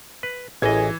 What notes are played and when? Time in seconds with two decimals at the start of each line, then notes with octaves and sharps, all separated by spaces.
0.23 B4
0.62 A1 E3 G#4 D#5 G#6